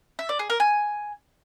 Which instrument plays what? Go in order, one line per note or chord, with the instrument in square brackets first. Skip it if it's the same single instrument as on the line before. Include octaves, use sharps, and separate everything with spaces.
[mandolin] E5
D5
G#4
A#4
G#5